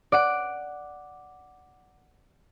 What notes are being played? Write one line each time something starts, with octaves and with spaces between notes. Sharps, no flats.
D5 F#5 D7